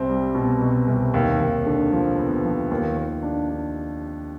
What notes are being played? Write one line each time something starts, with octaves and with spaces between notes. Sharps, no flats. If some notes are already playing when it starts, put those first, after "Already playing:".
Already playing: C2 C4
G3
B2
B2
C2
D#2
D#2
D3
F3
B3
F3
D#2
D#2
D4
D4